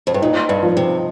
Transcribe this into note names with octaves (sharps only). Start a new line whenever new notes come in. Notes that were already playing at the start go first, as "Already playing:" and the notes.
F2
G2
A#2 D#4
G2
F3
C3